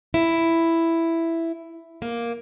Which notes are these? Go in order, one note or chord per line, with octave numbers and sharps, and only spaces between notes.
E4
A#3